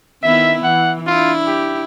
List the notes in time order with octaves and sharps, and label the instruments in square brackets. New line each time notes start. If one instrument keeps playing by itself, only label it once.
[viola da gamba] D#3 B3 E4 [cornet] E5
[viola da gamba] E3 [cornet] F#5
[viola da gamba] D4 E4 [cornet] F4
[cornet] G4